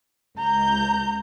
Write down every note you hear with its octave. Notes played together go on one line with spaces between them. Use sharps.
C#2 A#5 G6